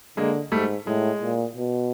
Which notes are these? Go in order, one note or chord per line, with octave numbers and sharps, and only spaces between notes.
D3 G#3 A#3
G#2 G3 A3
A2 G#3
A#2
B2